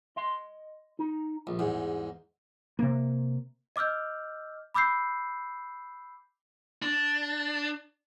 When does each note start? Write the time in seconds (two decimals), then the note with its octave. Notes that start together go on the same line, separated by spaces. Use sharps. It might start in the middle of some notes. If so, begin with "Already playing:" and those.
0.16 D#5 C6
0.99 D#4
1.47 A#1 G3
1.59 E2 G#2
2.79 C3 A#3
3.76 D#5 D6 E6 F6 G6
4.74 B5 D6 E6 G6 C7
6.82 D4